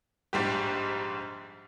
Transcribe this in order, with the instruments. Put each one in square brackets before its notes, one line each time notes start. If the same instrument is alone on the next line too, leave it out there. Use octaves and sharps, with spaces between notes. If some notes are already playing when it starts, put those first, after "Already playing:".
[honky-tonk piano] A#1 G#2 G3 G4